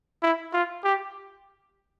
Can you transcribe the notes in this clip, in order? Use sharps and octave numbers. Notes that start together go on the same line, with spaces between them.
E4
F4
G4